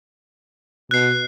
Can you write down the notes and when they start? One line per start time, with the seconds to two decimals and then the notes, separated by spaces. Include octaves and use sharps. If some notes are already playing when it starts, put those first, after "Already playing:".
0.91 B2 F#6 C7